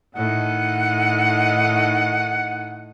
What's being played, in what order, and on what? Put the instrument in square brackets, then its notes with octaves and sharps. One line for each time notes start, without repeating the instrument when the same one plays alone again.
[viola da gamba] A2 D#3 D#4 [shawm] F#5